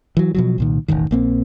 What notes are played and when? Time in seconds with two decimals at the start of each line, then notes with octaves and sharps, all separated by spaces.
0.17 E3 F#3
0.35 B2 F3 F#3
0.58 C2 A#2 D#3
0.88 E1 A1 F#2 D#3
1.11 A#1 A#3 C4